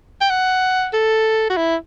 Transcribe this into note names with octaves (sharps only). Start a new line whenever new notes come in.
G5
F#5
A4
F#4
E4